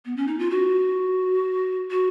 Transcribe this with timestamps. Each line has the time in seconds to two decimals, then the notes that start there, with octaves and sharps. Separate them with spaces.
0.05 B3
0.17 C#4
0.27 D#4
0.39 F4
0.50 F#4
1.91 F#4